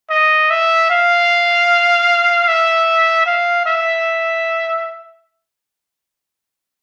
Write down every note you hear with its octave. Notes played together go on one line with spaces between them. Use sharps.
D#5
E5
F5
E5
F5
E5